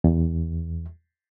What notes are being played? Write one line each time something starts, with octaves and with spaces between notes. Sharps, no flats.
E2